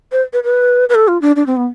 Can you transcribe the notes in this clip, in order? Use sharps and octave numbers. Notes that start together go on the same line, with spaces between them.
C5
B4
B4
B4
A4
F4
D4
D4
C4
B3